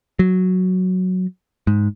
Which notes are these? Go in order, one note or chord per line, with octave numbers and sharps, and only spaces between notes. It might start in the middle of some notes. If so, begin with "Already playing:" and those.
F#3
G#2